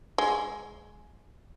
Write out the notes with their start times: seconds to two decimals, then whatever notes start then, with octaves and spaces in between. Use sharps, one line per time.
0.18 G#3